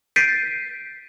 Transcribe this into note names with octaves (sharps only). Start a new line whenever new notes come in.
G6 A6 B6 C7 D7 D#7